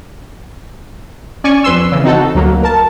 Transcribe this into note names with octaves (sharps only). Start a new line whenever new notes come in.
C#4 D5 G#5 C#6
F2 B4 C6 E6
C#3 E3
C4 D#4 F#4 A4
D2 F#3 A#3
A#4 A5